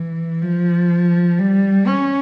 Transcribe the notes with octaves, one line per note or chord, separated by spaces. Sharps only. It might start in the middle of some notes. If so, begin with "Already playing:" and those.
Already playing: E3
F3
G3
C#4